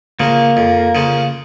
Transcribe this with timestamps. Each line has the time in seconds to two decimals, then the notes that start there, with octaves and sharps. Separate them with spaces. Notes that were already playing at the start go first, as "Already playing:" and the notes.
0.20 C#3 F3 A#3
0.57 F2
0.95 C#3 F3